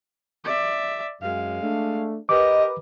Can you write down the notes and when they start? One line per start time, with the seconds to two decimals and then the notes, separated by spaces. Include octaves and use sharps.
0.44 D5 E5
1.21 F#2 G#3 F5
1.61 A3 D4
2.29 G4 A#4 B4 D#5 D6